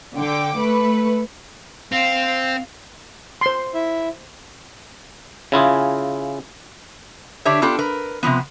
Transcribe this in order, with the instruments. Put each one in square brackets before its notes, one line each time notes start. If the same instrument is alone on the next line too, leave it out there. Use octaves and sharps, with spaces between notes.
[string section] D3 G5 D6
A3 B4
[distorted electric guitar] C4 [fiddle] F5
[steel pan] C5 C6
[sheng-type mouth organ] E4 E5
[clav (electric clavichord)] C#3 E4 F4 G#4
[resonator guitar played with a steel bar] D3 D4 G4 C#5 E5
B3 D4 F4 G4 A4
A#4 B4
C3 D#3 F3 B3